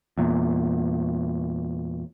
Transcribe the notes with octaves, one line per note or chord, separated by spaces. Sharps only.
E2 A#2